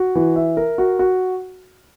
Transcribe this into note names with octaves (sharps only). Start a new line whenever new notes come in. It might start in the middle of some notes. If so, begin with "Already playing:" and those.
Already playing: F#4
E3
E5
A#4
F#4
F#4